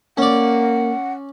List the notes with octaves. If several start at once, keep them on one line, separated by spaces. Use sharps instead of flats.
A#3 C#4 D5 F#5